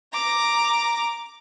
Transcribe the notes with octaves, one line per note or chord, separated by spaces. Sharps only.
A#5 D6